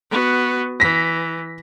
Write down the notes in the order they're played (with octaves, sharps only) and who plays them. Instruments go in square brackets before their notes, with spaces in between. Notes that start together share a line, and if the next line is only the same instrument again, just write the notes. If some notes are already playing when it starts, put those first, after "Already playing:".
[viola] B3 F#4
[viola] E3 [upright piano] A#6 B6